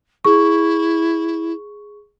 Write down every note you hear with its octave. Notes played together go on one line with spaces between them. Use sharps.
E4 G#4 C#6